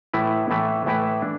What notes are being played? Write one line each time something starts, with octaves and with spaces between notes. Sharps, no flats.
A2 E3 A3 E4 B4
A2 E3 A3 E4 B4
A2 E3 A3 E4 B4
D4